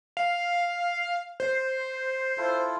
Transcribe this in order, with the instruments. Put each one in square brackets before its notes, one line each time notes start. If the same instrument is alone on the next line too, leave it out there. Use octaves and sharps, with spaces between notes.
[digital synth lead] F5
C5
[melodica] E4 F4 A4